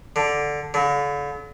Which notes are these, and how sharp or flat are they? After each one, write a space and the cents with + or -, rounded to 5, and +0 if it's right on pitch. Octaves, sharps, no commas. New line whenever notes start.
D3 +0
D3 -40